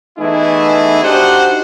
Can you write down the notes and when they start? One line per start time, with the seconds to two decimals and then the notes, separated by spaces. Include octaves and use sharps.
0.19 E3 A3 B3 D#4 E4 G#4
1.03 D4 D#4 F#4 G4 C5 F#5